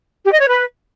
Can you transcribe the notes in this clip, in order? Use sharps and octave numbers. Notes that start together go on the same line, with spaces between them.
G4
D#5
C#5
B4